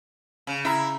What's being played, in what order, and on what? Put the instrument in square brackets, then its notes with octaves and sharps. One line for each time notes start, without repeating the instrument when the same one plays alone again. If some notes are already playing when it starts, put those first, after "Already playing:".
[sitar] C#3
[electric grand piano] C#3 A#5 [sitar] E4